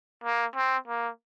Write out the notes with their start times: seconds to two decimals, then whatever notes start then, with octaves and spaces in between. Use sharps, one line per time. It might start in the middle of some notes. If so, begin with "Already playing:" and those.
0.24 A#3
0.56 C4
0.88 A#3